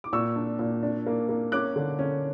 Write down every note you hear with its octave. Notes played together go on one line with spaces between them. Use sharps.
D6
A#2 C#6 E6
D4
A#2
D4
A#3
A#3
C#4 D6 F#6
D3
C#4